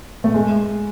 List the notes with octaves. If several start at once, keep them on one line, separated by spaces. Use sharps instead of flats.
A3
G#3